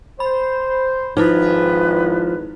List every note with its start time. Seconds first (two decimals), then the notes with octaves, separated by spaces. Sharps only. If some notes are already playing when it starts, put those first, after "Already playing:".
0.20 C5 B5
1.17 G#1 F3 D#4 E4 B4